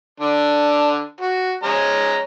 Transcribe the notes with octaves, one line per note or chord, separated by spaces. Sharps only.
D3 D4
F#4
G#3 C#4 A#5